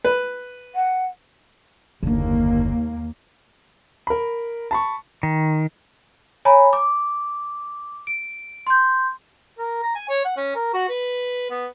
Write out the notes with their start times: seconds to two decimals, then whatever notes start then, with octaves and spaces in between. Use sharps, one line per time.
0.04 B4
0.75 F#5
2.03 F#1 D#2 D3 A#3
4.07 A#4 B5
4.71 A5 B5 C#6
5.23 D#3
6.45 C#5 G#5 A#5 B5
6.73 D6
8.07 D7
8.67 C6 G6
9.58 A#4
9.83 A#5
9.95 G#5
10.09 C#5
10.25 F#5
10.37 C#4
10.55 A#4
10.74 F#4
10.89 B4
11.50 B3